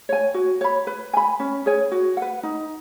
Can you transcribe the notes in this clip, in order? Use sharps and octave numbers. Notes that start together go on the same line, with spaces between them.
C#5 G#5
F#4
C#5 B5
B4
G#5 B5
C#4
G#4 C#5 G#5
F#4
B4 F#5
D#4